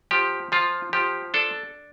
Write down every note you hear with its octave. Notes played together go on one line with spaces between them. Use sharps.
F3 G4
F3 F4
F3 G4
D4 A4